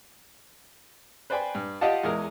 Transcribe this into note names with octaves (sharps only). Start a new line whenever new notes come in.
B4 C5 D5 G5 G#5 B5
G2
F4 G4 D#5 F5 F#5 A5
E2 G#3 A#4